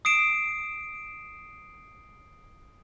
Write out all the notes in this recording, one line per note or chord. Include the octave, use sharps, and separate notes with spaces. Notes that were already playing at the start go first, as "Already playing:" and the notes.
D#6 C7 D7 E7